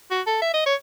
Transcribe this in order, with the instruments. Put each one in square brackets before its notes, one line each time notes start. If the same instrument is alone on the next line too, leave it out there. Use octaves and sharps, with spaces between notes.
[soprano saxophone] F#4
A4
E5
D#5
C#5